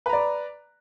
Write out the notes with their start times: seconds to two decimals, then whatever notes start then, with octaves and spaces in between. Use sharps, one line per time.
0.06 B4
0.09 A#5
0.13 D5